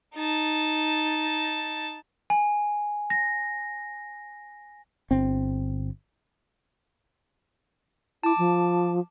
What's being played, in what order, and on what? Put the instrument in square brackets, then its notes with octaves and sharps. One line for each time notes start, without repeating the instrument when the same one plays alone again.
[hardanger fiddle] D#4 A5
[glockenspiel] G#5
A#6
[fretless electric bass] G1 C4
[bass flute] E4 [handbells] A5 D6
[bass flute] F3